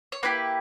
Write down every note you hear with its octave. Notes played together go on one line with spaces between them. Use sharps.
C#5
A#3 E4 G4 B4